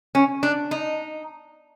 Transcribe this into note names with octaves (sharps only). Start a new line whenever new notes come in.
C#4
D4
D#4